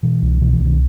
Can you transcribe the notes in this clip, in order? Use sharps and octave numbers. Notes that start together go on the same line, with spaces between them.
B2 E3
C2
B2 E3
E3
C2
D#3